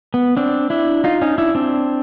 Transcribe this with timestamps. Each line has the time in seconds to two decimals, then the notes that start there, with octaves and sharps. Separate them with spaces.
0.14 B3
0.37 C4 D4
0.70 D4 E4
1.04 D#4 F4
1.22 C#4 D#4
1.38 D4 E4
1.55 C4 D4